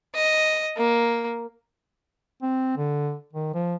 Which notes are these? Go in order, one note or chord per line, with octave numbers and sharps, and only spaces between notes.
D#5
A#3
C4
D3
D#3
F3